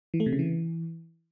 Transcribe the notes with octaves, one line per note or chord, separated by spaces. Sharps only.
E3
A3
C3
C#3
E3